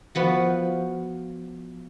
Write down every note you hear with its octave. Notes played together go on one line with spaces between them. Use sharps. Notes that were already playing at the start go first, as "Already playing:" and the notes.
F3 B3 F#4